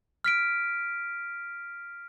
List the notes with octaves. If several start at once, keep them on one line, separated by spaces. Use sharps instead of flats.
F6 B6 D7